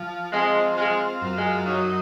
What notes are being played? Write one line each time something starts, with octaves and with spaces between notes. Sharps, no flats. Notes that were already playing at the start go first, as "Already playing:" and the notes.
Already playing: F3
G#3 C4
G#3 F4
F#2
G#3
F#3 D#4